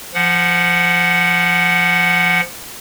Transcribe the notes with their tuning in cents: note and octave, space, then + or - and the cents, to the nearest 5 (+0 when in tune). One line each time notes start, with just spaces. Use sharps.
F3 -15 F#5 +0